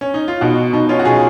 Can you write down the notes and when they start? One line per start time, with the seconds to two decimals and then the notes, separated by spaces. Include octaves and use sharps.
0.01 C#4
0.14 D#4
0.28 F4
0.41 B2 D#4 F#4
0.73 B2 D#4
0.89 C#4 F4
0.99 F#4
1.05 B2 F4 G#4